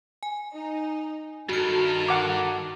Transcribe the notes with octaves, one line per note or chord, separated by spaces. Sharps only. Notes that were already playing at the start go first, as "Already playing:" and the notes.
G#5
D#4
G2 D#3 F#4 A4 A#4 F6
F#5 D6